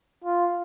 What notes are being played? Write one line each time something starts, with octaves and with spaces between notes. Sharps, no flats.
F4